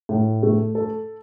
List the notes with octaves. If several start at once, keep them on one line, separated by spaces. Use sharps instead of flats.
A2
A3
A4